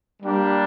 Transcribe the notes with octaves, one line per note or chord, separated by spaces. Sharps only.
G3 A#3 D4 G4